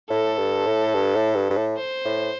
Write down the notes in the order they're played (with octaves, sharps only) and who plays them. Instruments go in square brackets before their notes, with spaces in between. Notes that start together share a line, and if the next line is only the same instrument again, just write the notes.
[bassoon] A2 [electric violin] A4
[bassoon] G2
A2
G2
A2
G2
G2
A2
[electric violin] C5
[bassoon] A2